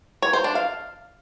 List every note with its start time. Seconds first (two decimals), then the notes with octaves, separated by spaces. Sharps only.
0.22 C#5
0.33 C5
0.44 D4
0.55 F5